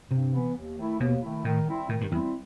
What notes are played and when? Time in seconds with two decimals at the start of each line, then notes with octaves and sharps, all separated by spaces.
0.11 G2 C3
0.33 E3 B3
0.55 D#2
0.78 D#3 A3 E4
0.99 D#2 B2
1.22 D#3 A3 E4
1.45 A2 D#3
1.67 G3 C4 E4
1.89 A2 D#3
2.01 G2
2.12 E2 G3 C4 E4